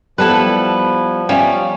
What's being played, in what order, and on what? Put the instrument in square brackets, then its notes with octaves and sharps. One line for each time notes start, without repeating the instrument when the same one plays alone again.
[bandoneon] F3 [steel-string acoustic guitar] G3 B3 [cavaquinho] E4 A4 B4
[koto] G3 C#4 [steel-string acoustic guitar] E5 F5